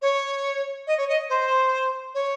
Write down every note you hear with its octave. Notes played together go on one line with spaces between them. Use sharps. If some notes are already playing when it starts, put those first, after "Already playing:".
C#5
D#5
C#5
D#5
C5
C#5